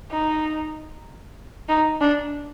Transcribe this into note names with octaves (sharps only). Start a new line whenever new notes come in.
D#4
D#4
D4